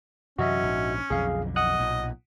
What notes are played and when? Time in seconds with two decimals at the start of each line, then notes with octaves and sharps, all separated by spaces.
0.39 F#2 C3 E3 C#4 F#4 D#5 E5
0.63 A#1 G#2
1.10 B1 F2 D3 G#4 F5
1.56 D#5 F#5 D#6 F#6
1.79 B1 A#2